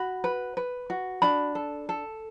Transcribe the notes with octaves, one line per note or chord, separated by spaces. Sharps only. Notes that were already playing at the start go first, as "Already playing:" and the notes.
Already playing: F#4 B5
B4
B4
F#4
D4 B5
A4
A4